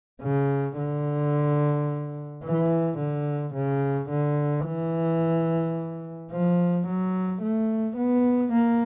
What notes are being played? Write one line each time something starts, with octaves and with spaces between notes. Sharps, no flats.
C#3
D3
E3
D3
C#3
D3
E3
F3
F#3
A3
B3
A#3